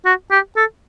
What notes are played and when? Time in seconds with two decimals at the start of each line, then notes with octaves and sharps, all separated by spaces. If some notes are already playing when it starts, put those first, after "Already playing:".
0.06 F#4
0.31 G4
0.57 A4